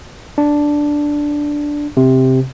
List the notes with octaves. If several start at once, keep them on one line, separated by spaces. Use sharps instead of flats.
D4
C3